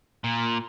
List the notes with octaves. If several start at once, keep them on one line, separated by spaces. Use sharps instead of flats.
A#2